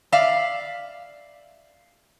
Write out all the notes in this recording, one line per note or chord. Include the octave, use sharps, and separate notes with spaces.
D5 E5 F5